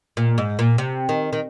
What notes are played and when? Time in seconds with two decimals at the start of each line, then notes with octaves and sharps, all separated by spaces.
0.17 A#2
0.38 G#2
0.59 A#2
0.78 C3
1.09 D#3
1.33 D#3